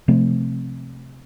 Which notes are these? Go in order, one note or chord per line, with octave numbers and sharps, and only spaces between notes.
C3 F3 A3 C4